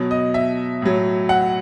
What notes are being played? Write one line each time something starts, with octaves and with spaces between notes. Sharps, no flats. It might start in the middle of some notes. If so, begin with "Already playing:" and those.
Already playing: B2 F#3
D#5
E5
A2 F#3
F#5